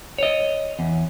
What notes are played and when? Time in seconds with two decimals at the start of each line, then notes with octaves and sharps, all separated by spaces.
0.18 C#5 D#5
0.79 E2